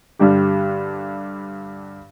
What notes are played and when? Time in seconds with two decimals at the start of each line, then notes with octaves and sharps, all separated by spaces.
0.19 G2 D3 G3 D4 G4